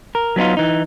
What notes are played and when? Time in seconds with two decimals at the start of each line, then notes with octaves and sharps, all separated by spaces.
0.15 A#4
0.36 F#3 B3 D4 D#4 F4
0.57 E3 D#4